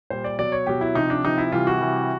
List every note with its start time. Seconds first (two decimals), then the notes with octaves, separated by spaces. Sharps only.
0.10 A#2 G3 C5
0.24 D5
0.39 B2 F#3 D5
0.52 C#5
0.67 B2 F#3 G4
0.81 E4
0.95 C3 F3 D#4
1.10 D4
1.24 C3 F3 D#4
1.38 E4
1.52 C3 E3 G3 F4
1.67 F#4
1.81 C3 E3 G3